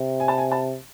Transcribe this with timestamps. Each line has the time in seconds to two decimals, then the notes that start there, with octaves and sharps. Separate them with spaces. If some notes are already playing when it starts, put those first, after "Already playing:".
Already playing: C3
0.20 G#5
0.28 A5
0.38 G#5
0.52 A5